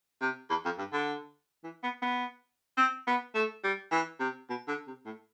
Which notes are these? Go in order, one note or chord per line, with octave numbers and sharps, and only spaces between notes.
C3
E2
F2
G2
D3
E3
B3
B3
C4
B3
A3
G3
E3
C3
B2
D3
C3
A2